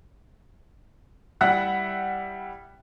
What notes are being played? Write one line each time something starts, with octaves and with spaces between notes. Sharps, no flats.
G3 E4 E5 F#5 F#6